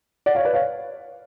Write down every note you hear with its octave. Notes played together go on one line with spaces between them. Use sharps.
D5 F#5
C#5 F5
B4 D5
C#5 F5